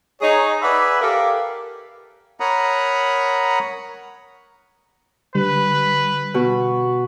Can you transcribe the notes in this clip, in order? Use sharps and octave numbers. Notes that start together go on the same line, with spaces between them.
D#4 G#4 C#5
B4 D5 E5 F#5 G#5 B5
G4 A4 A#4 F5
A#4 C#5 F#5 A#5 B5 D#6
D3 G3 B4
B2 F#4